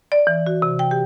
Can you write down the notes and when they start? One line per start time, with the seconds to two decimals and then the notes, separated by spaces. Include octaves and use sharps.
0.12 D5
0.27 E3
0.47 F#4
0.62 C3
0.79 G5
0.91 G4